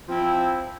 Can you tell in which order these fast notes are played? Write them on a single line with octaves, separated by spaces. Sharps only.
F3 C4 E4